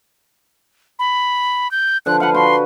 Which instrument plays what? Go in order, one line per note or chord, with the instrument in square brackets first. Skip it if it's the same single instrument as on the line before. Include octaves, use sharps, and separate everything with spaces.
[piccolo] B5
G6
[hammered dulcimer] D3 F3 [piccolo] F#6
[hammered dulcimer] B4 F5 [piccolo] F#5
[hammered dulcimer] F#4 [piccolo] C6